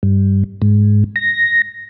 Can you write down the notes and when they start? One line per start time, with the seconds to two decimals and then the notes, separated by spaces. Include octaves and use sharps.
0.03 G2
0.62 G#2
1.16 A#6